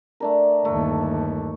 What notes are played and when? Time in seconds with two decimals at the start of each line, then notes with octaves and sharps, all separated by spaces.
0.20 A3 D4 A#4
0.65 G1 D#2 A3